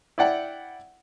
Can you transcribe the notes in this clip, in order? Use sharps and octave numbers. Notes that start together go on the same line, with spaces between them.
E4 D5 F#5 G5